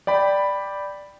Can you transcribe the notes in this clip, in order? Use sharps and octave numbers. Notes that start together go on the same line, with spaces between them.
D5 G5 B5